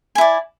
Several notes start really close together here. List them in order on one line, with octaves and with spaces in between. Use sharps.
G#5 E4 D5